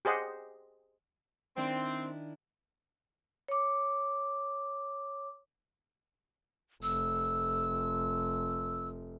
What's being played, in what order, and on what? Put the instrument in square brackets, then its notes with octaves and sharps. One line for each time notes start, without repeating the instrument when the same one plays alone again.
[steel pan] G4 G#4 C5 D#5 F#5
[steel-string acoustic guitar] D#3 D4 E4 [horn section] C4
[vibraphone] C#5 D6
[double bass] F1 [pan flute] E6